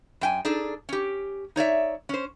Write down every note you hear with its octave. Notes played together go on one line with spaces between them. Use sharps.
F#2 G5 G#5
D4 D#4 G#4 A4
C#4 G4
D#4 C#5 D5 E5
C#4 C5